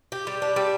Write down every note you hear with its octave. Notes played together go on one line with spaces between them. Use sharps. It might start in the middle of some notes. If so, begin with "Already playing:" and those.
G4
G3
D4
G3